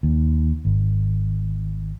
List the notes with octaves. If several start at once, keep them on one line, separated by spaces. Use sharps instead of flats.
D#2
G#1